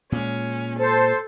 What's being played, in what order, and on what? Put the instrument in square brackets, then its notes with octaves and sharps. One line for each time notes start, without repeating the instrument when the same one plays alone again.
[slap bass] A#2 G#3 [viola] C#4
[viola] A4 [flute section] C5 A5